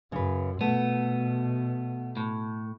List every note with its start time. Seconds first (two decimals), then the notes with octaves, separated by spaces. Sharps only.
0.12 F#2 C#3 B4
0.61 B2 A3 B3
2.17 A2